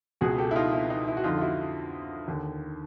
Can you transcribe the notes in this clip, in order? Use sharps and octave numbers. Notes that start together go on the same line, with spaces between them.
C#2 B2 F#4 G#4
G4 A4
E4
D#4 F4
E4
D#4
E4
F#4
F2 D3 D#4 F4
F4
E4 F#4
D#2 D3